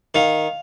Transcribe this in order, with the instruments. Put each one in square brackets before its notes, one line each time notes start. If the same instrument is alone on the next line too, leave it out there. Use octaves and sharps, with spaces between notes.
[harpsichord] D#3 F5